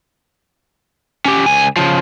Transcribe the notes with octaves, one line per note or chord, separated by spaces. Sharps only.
C#4 G4
C#2 G#5
C#3 F3